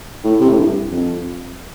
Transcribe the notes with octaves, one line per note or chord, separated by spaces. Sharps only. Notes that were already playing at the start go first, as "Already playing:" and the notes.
A2
C3
A2
G2
F2